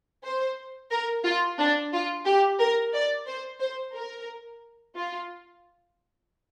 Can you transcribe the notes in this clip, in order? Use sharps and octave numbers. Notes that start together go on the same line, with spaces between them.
C5
A#4
F4
D4
F4
G4
A#4
D5
C5
C5
A#4
F4